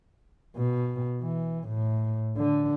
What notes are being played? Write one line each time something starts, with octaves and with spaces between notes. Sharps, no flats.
B2
E3
A2
D3